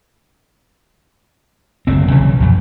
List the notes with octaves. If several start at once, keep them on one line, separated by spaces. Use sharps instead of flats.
F#1 D3 C4
B1 C#3 E3 C#4
A#1 F#2